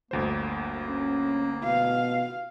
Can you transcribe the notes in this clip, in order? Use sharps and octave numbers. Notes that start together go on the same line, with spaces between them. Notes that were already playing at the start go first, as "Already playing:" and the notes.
G1 D2 A#3 C5
C#4
B2 F5